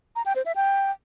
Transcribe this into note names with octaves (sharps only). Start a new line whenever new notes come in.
A#5
G5
C5
E5
G5